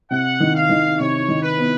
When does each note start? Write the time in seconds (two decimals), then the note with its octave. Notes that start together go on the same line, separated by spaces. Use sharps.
0.11 C3 F#5
0.40 D#3
0.55 F5
0.70 D#3
0.99 C3 C#5
1.28 D#3
1.43 B4
1.58 B3